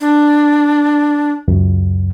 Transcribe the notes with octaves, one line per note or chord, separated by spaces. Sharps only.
D4
C#2 F#2